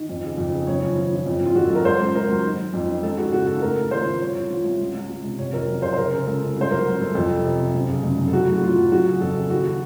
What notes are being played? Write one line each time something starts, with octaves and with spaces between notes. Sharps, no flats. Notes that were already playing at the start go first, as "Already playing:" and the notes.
Already playing: D#3
F2
C#3
F2
C#3
F#2 C#5
F3
F3
F3
F2
F2 F4
F2 F#4
A4
F#3
A#4
C#2 C5
C#2
C#2 A#4
F#3
D#3
D#3
F2
D#3
C#2 A4
C#3 F#4
C#3 F#4
C#3 A4
A2 A#4
A2
F3 C5
F3
C2 C#5
C2
F3
C2
C#2
C#2
C#2
C3
C3 C#5
F2 A#4
F#3
C3 C5
C5
C#3 A#4
C#3
C#2 A4
C#2
C2 C5
F#3 A#4
F#3
C2 A4
F2 A4
C3
C3
C3
F#2
C#3
F#2
F#2
A4
F#3 F#4
A2
F#4
A2 F4
F#3
F#3 F#4
C#3
F2 A4
C#3
D#2 F#4